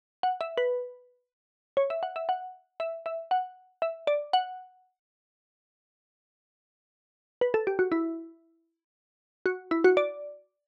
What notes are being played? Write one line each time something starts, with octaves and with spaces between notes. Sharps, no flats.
F#5
E5
B4
C#5
E5
F#5
E5
F#5
E5
E5
F#5
E5
D5
F#5
B4
A4
G4
F#4
E4
F#4
E4
F#4
D5